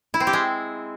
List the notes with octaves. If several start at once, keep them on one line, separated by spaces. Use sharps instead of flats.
E4
C4
G4
G#3